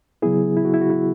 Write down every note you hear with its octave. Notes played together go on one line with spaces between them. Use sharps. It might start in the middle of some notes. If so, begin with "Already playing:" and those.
C#3 F#3 B3 E4 G#4
E4
F#4
E4
F#4
E4